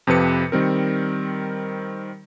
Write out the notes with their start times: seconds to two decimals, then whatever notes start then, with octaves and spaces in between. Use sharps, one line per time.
0.07 F2 C3 F3 B4 C#7
0.52 D#3 G3 C4 A#4